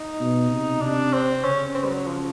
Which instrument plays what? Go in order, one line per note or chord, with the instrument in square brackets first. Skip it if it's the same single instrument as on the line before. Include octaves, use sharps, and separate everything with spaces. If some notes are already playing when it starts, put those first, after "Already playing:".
Already playing: [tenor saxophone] D#4
[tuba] B2
C3
[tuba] C3 [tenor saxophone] D4
[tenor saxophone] C4
[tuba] C#3 [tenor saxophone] C#4
[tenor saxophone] C4
G3
F#3
F3